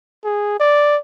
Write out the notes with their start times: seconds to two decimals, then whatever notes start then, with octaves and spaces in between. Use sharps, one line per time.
0.24 G#4
0.60 D5